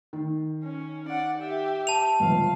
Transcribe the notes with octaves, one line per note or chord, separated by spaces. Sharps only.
D#3
C#4
D5 F#5
G4 E5
A5 F7
G1 C#2 F3 F5